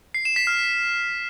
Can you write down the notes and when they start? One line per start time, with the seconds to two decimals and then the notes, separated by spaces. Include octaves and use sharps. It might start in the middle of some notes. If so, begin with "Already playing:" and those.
0.14 C7
0.25 E7
0.36 B6
0.47 F6